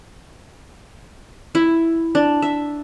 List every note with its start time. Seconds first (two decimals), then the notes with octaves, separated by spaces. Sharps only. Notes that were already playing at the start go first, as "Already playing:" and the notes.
1.55 E4
2.15 D4
2.42 E5